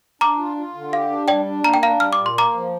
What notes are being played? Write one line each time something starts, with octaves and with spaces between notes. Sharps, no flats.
D4 A#5 D6
F4
F4
D3
G4 F5
D4
G3 D5 G5
D4
A#3 A#5
G5
D4 F5 A#5
G3 F6
D6
A#2
C6
A#3 A#5 D6
F3